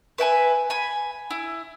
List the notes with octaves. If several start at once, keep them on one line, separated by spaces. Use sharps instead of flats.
B4 E5 G5 G#5
G#5 B5
E4